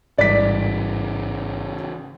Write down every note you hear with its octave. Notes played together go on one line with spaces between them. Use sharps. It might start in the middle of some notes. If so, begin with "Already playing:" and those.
A1 G#2 C#3 E3 G3 D5 B6